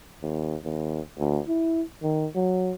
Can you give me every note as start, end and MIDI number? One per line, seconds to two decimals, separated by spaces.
0.22 0.56 39
0.64 1.00 39
1.19 1.41 38
1.48 1.83 64
2.03 2.27 51
2.35 2.73 54